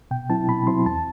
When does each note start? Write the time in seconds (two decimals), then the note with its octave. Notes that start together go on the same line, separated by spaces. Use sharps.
0.11 B2 G5
0.30 F#3 C4 E4 A5
0.48 B2 B5
0.67 F#3 C4 E4 C6
0.86 E2 A5